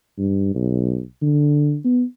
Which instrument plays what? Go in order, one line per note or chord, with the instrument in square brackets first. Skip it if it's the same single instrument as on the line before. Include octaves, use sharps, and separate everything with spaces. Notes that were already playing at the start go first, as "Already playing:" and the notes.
[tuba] G2
B1
D3
B3